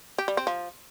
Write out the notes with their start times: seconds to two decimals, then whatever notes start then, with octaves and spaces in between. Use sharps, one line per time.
0.18 G4
0.28 G3
0.37 C4
0.47 F3